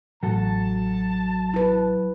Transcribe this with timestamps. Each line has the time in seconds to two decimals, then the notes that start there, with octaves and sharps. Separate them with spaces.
0.23 A1 F#3 F#4 A4 A5
1.54 E4 B4